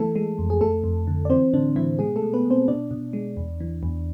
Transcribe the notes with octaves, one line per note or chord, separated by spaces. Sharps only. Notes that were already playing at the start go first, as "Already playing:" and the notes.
Already playing: E3 A3 A4
G#3
F2
G#4
F2 A3 A4
F2
D3
D5
E3 C4 C5
A2 D3 D4
A2 E3 E4
B2 G#3 G#4
A3 A4
B2
B3 B4
B2
C4 C5
B2 D4 D5
B2
G#3
E2
E3
E2